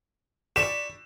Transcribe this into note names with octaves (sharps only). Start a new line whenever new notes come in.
D5 B5 C#6 E7